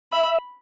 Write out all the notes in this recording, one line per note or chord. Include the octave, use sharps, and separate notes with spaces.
E5 B5